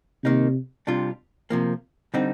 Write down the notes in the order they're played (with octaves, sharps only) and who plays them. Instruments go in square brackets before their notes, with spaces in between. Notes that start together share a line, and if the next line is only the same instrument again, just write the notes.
[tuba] C3 [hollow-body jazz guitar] D#3 A#3 D#4
[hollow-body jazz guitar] C3 G3 D4 F4
C3 F3 A#3
D3 G3 C4 D#4